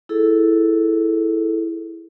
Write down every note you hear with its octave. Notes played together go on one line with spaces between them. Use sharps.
E4 G#4 A4